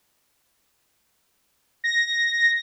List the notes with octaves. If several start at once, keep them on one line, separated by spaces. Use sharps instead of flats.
A#6